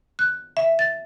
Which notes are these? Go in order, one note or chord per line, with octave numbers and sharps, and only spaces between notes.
F#6
E5
A6